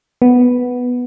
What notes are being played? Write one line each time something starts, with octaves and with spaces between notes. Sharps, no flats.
B3